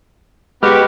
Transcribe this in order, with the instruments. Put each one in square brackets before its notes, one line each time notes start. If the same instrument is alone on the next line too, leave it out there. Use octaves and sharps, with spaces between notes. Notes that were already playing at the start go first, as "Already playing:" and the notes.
[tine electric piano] G#3 B4 F6 [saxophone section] B3 F#4 G4